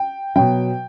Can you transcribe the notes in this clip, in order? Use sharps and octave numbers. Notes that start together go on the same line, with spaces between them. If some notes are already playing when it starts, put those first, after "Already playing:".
Already playing: G5
B2 F#3 G5